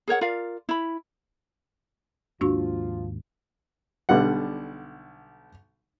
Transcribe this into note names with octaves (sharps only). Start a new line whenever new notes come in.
G#4 A#4 C#5 F#5
F4 A#4 D5 F5
E4 B5
D#2 G#2 F3 A#3 D4 F4 F#4 C#6
B1 D3 G3 F#5